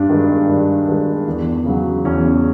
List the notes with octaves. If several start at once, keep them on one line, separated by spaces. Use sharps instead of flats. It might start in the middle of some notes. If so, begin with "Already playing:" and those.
Already playing: G2 D4
D#3 G#3
G2
D#3 G#3
E2
C#3 F#3
E2 C#4